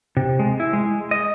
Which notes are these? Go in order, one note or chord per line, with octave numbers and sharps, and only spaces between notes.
C3
G#3
E4
G#3
D#5